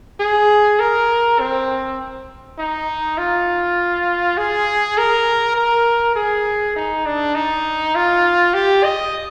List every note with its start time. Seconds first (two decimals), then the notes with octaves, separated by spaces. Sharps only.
0.20 G#4
0.80 A#4
1.40 C4
2.59 D#4
3.18 F4
4.37 G#4
4.98 A#4
5.56 A#4
6.16 G#4
6.76 D#4
7.06 D4
7.35 D#4
7.95 F4
8.54 G4
8.84 D#5